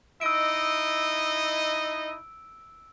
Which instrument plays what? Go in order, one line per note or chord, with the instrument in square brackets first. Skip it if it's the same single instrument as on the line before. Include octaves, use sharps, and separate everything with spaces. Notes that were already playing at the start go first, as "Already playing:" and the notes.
[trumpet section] D#4 E4 D#5 [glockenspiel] E6 D7